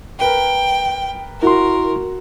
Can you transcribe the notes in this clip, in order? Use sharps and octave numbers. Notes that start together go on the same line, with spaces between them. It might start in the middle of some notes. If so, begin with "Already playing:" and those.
A#4 B4 G5
E4 F#4 A#4 C6